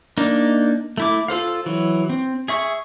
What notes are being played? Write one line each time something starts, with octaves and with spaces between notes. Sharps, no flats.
A#3 D4 D#4
A3 E4 D6
F4 A4 C5 F5
E3 F#3
C4
G#4 E5 C#6